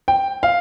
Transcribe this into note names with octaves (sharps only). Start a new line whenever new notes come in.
G5
F5